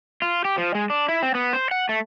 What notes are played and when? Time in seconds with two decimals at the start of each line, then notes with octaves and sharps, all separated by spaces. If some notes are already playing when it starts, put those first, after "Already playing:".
0.22 F4
0.45 G4
0.58 F3
0.75 G#3
0.90 D4
1.08 E4
1.22 C4
1.35 B3
1.53 C5
1.71 F#5
1.89 A3